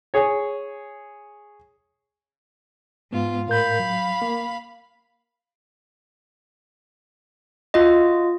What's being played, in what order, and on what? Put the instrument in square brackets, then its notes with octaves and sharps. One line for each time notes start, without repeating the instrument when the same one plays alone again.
[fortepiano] G#4 C#5
[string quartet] G#2 F4 [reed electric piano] B3
[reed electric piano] A2 A#4 G6 [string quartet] F5 B5
[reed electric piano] F#3
A#3
[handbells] F4 F#4 D#5